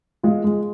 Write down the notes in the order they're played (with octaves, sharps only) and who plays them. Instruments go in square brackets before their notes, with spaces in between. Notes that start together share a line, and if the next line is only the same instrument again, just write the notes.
[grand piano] G#3 [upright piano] F4
[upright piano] G#3